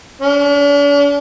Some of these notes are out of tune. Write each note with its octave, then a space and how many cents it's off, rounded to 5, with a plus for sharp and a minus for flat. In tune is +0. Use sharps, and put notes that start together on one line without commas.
D4 -45